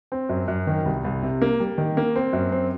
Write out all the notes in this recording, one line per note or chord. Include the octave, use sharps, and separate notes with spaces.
C4
F#2
F#2
D#3
C2
C2
C3
A#3
G3
D#3
A#3
C4
F#2
C4